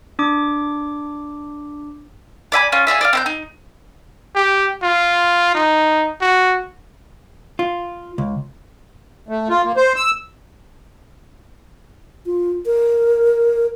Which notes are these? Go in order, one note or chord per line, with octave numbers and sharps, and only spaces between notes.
D4 D6
D5 E5 G#5 B5
C#4 F4
F4 G#4 D5 E5
D5 D#5 F5
C4 E5 G6
D#4
G4
F4
D#4
F#4
F4
C#2
A3
F4
A#3
C5
E6
F4
A#4